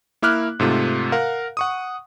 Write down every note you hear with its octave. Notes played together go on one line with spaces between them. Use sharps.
A#3 E4 D6 F6 F#6
G#2 C3 A3 F4
A#4 F5 F#5
F#5 C#6 D#6